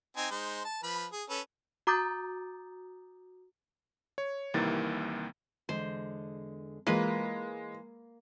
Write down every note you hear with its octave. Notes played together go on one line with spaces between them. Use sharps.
C4 D#4 G#5
G#3 D#4 C5
A5
F3 B4 B5
G#4
C#4 A4 B4
F#4 A#5 D6 D#6 G6 A6
C#5
C2 C3 D#3 E3 A#3 A6
E2 D3 G#3 C5
E3 G#3 A#3 F4 B4